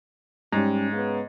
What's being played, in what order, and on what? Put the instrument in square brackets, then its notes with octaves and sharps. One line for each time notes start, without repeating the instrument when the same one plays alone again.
[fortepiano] G#2 [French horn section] G3 C#4
[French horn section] C#3 B3